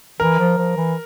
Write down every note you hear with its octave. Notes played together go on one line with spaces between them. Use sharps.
E3 A#4
F3
F3
E3